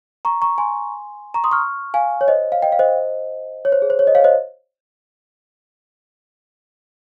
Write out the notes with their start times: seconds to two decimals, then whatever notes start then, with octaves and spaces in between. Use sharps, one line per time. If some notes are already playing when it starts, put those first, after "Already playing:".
0.25 A#5 C#6
0.42 A#5 C#6
0.58 G#5 C6
1.34 A#5 C#6
1.44 C6 D#6
1.51 C#6 F6
1.94 F5 G#5
2.21 C#5
2.28 C5 D#5
2.52 F5
2.62 D#5 G5
2.72 F5
2.79 C5 D#5
3.65 C#5
3.72 C5
3.82 G#4
3.90 C5
3.99 C#5
4.07 C5 D#5
4.15 C#5 F5
4.24 C5 D#5